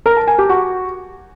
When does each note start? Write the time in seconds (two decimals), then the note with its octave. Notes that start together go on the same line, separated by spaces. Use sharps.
0.06 A#4
0.17 A5
0.28 G#5
0.38 G4
0.49 F#4